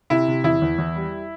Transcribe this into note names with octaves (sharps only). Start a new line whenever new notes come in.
C3 E4
C3
E2 E4
E2
E2
G3